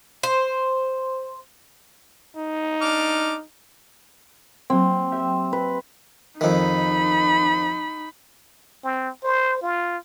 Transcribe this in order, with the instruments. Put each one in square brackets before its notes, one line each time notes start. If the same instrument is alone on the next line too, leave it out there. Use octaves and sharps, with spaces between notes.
[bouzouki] C5
[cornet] D#4
[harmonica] D4 D6 F6
[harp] F#3 A#3 [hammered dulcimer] C4
[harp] G4 A#4 E5
[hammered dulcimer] B4
[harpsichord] F2 D#3 [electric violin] D#4 B5
[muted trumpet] C4
C5
F4